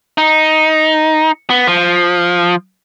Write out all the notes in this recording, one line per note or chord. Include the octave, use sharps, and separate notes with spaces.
D#4
B3
F3